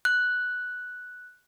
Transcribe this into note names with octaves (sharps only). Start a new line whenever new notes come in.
F#6